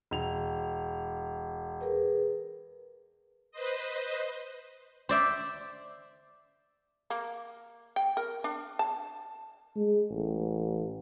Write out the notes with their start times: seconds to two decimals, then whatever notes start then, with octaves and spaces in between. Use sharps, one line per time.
0.11 E1 F7
1.81 G#4 A#4 B4
3.52 B4 C5 D#5
5.09 C5 D5 E5
7.10 A#3
7.96 G5
8.17 A#4
8.44 D4
8.79 A5
9.76 G#3
10.11 A1